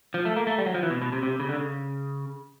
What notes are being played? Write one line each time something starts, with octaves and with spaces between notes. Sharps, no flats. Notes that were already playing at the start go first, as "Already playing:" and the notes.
F3
A3
A#3
A3
G3
F#3
F3
E3
B2
B2
C3
C3
C#3
D3
C#3